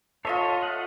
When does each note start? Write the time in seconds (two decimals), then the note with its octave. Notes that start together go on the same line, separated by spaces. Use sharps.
0.25 F4 A4 C5 C#5 D#5 E5
0.63 F#5